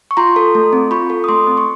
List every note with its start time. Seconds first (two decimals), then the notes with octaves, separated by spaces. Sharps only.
0.11 C#6
0.17 F4 A#5 C6
0.36 A4
0.55 A3
0.73 C4
0.91 F4 B5 C#6
1.10 A4
1.24 D#6
1.29 A3 C6 D6
1.47 C4
1.57 C#6